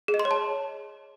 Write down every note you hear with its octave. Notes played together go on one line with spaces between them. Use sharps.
G#4
D#5
C6
C#5
A5